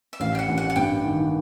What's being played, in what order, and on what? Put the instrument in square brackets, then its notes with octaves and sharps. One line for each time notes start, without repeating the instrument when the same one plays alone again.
[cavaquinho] E5
[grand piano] A1 [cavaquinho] F5
[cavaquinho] G5
F#5
[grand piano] A1
[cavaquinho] F#5
F#5
[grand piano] G2 [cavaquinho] G5
[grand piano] D#3